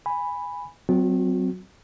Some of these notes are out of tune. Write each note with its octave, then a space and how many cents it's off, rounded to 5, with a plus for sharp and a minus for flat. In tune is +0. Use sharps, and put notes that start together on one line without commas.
G#5 -15 B5 +0
F#3 +25 C4 -25 F#4 -40